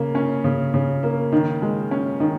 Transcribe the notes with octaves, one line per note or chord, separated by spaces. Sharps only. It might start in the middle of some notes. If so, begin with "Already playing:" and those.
Already playing: C#3 A#3
C#4
C#3
C#3
A#3
D#3
G#3
C#4
D#3